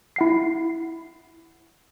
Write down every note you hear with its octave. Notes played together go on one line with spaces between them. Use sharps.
E4 F#5 C7